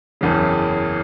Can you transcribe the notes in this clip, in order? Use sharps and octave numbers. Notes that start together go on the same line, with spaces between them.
F#1 E2 C#3